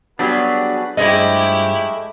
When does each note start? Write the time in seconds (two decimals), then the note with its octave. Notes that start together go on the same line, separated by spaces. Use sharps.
0.19 F#3 G3 B3 D4 F#4 G#4 B4
0.97 G2 F3 G#3 A3 E4 G4 G#4 D#5